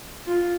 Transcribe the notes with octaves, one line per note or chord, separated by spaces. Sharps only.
F4